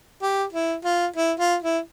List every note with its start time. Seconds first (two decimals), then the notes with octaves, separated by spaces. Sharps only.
0.22 G4
0.53 E4
0.85 F4
1.16 E4
1.40 F4
1.63 E4